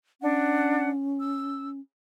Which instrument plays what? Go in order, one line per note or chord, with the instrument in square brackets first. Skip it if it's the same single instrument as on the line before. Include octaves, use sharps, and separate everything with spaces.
[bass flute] C#4 [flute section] D4 F#5
[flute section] E6